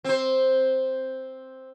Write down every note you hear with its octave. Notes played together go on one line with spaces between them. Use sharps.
C4 C5